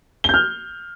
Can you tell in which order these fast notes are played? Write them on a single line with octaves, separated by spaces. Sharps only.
G7 G6 F6